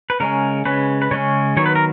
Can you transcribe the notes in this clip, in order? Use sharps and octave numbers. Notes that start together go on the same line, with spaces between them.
B4
C#3 G#3 C#4 A#4
C#3 G#3 C#4 B4
B4
C#3 G#3 C#4 C#5
D#3 F#3 B3 C#5
B4
A#4